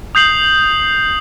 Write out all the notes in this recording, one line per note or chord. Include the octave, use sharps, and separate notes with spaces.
D#6 G6 C7 F#7